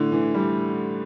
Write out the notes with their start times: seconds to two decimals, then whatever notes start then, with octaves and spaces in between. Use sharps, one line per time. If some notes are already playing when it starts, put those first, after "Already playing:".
Already playing: A2 D3
0.12 E3
0.35 G3